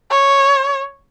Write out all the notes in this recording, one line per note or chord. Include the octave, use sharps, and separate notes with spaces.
C#5